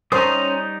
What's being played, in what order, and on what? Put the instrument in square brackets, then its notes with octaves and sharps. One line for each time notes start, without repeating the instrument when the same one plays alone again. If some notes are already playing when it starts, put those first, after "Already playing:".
[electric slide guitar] G3 D#4 [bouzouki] C#4 [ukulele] C5 [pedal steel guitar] A#5 D#6